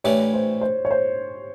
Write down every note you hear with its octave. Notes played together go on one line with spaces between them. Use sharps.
A2 E3 A3 D4 G4 C#5
C5
C5
C#5
C5